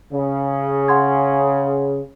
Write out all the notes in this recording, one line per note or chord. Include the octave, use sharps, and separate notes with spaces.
C#3
F#5 C6 G#6